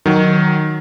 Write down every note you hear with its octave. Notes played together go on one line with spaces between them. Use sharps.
D#3 F#3